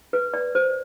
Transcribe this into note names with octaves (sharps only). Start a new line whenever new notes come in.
B4
D5
C5